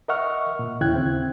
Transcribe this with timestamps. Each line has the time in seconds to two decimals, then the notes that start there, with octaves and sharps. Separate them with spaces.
0.08 A#4 D#5 E5 F#5 C#6 F6
0.59 A#2
0.81 D#2 C#3 E4 G5 F#6 G#6
0.96 C4